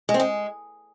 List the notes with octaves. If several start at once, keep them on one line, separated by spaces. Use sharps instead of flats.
G#3
C4
G#3